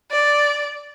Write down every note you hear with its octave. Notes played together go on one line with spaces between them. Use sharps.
D5